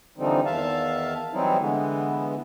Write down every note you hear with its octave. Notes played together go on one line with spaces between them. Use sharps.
D3 E3 F3 G3 C4 D#4
E2 D#3 E5 F5 A5
E3 F#3 G3 C4 D#4 E4
D3 E3 G#3 B3